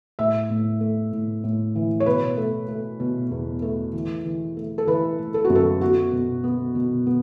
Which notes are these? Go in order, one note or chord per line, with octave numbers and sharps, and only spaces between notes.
A2 E5
A2
A3
A2
A2
E3
C#5
B2 B4
A3
A3
B2
E2
A3
E3
E3
A3
A4
E3 B4
A3
A4
F#4
F#2
A4
B3 F#4
B2
B3
B2
B3